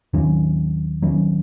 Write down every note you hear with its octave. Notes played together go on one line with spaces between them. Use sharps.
D#2 D#3 F#3 C#4
D#2 D#3 F#3 C#4